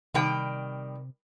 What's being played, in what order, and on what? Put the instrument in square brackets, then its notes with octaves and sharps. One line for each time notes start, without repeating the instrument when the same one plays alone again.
[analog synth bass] C3 [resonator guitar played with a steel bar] D#3 G3 G5